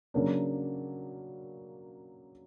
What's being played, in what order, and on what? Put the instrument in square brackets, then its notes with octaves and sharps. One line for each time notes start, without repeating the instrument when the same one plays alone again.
[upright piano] C#3 F#3 A#3 D4